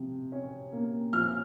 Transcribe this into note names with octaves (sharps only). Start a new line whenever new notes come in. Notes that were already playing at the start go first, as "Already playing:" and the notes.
Already playing: C3 F3
C#4
A#3
F3 F6